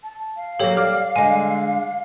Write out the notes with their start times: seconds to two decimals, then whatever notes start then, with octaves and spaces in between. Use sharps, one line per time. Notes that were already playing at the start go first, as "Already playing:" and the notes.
0.03 A5
0.37 F5
0.60 F#3 A#3 G4 A4 C#5
0.77 D5 F6
1.16 D3 G#3 D#5 G#5